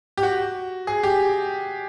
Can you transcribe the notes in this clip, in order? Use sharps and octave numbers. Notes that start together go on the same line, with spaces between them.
G4
F#4
G#4
G4